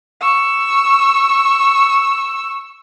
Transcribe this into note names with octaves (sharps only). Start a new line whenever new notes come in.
C#6 E6